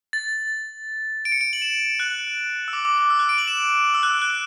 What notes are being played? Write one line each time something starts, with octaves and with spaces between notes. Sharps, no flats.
A6
D7
C#7
D7
F#7
E7
F#6
E6
D6
D6
D6
E6
F#6
D7
F#7
E7
E6
F#6
F#6